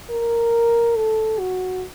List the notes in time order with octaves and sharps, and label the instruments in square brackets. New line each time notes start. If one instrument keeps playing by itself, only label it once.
[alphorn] A#4
A4
F#4